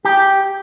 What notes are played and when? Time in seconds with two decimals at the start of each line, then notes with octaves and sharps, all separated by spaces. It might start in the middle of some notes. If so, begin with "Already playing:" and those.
0.05 G4